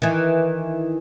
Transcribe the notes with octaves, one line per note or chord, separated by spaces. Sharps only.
D#3 E3